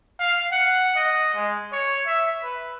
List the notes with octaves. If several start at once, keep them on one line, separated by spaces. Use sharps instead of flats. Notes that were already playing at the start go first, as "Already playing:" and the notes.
F5
F#5
D#5
G#3
C#5
E5
B4